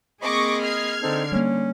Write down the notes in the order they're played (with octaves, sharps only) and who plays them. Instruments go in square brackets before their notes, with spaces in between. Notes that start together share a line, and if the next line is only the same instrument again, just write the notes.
[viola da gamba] A#3 C4 G#4 [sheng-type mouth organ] D#5 B5 [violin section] C#6 D6 A#6
[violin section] F6 G#6 C7
[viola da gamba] D3 [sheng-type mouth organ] C4 D#4 A4
[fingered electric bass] G3 A#3 [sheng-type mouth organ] C#4